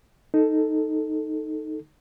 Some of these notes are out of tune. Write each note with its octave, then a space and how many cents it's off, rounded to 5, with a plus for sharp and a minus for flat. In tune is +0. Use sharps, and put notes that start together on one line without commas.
D#4 +0 A4 +0